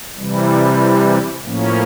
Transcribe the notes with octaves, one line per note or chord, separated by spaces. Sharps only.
C3 E3 G3
A2 F3 A#3 C#4